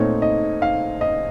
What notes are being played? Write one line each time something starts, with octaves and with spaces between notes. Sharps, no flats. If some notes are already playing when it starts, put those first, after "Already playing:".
Already playing: A#2 A3 C4 D#4 C#5
D#5
F5
D#5